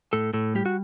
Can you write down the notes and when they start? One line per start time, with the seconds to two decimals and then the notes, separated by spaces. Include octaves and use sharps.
0.13 A2 A4
0.33 A2 A4
0.55 G3 G4
0.66 F#4